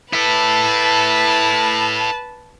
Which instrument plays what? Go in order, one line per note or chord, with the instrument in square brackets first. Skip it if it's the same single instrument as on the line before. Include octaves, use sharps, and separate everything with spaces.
[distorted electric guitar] E4 A4 [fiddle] B4 A5